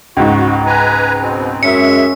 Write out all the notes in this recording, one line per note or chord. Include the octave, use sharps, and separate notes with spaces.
C#2 G#2 F#4
B4 G#5 A#5
B2 C4
F#2 G#3 C#4 E5 C#7